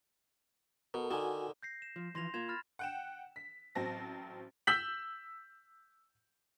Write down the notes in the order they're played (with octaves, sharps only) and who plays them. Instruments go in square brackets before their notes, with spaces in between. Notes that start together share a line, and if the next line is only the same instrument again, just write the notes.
[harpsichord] B2 [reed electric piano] A4 A#4
[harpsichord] D3 D#3 [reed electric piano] F#4 G#5
[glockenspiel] G6 A#6 C7
E7
[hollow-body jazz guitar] F3
[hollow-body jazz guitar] E3 F3 [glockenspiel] C6 A#6 F7
[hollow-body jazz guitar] A#3 F4 [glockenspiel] G#6 E7 F7
[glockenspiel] B5 F6 A6
[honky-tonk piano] F#5 G5 E7
B6
A1 F#3 C4 A5 A#6
E6 G6 B6 F#7